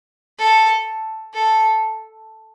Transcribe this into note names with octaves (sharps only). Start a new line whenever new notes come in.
A4
A4